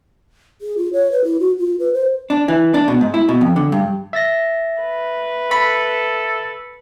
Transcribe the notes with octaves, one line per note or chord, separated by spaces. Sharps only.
G#4
F4
C#5
B4
E4
F#4
F4
B4
C5
D4
E3
D4
B2
G#2
E4
B2
F2
D3
G2
E5 A6 A#6
B4
A4 B5